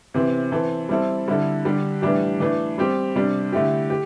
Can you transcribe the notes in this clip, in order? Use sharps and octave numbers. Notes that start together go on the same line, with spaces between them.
C3 E3 C4
E3 C4 A4
G3 C4 E4 A4
D3 G3 E4 A4
D3 G3 D4 G4
A2 E3 G3 D4 G4
E3 A3 D4
G3 C4 G4
C3 G3 D4
D3 A3 E4 G4
G4